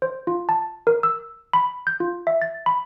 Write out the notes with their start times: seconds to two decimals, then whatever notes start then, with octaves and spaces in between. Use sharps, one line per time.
0.02 C5
0.27 F4
0.49 A5
0.87 A#4
1.03 E6
1.53 B5
1.87 G6
2.00 F4
2.27 E5
2.42 A6
2.66 B5